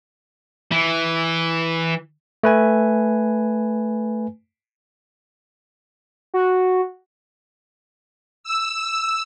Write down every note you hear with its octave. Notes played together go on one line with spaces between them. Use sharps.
E3
A3 B4 G#5
F#4
E6